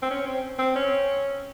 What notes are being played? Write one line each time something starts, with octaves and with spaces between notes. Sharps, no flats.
C4
C#4
C4
C4
C#4